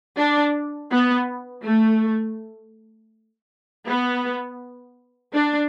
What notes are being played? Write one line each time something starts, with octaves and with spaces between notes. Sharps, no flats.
D4
B3
A3
B3
D4